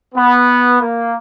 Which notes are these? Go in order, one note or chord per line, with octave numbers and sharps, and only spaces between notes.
B3
A#3